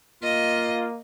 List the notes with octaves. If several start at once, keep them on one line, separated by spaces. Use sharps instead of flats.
A#3 F4 D#5